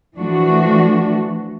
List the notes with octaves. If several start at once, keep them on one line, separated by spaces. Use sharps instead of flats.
E3 F3 A3 D4 F#4